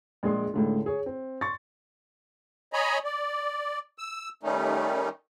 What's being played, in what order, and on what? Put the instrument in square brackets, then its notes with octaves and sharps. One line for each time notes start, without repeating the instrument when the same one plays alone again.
[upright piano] A#1 G#3 G#4 C6
C#2 A2 D3
G#4 C#5
C4
C6 C#6 A6
[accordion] C#5 D#5 G#5 A#5 B5
D5
E6
D#3 G3 A3 C#4 D#4